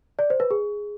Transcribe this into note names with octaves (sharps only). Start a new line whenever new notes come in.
D5
C5
B4
G#4